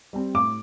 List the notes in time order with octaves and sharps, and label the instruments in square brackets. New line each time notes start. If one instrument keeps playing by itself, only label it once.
[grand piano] G3 C4 G4
[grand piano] A2 [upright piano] D6